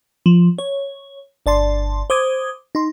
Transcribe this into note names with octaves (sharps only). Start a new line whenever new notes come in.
F3
C#5
G1 D5 A5 C6
C5 D6 D#6 G#6
D#4 C6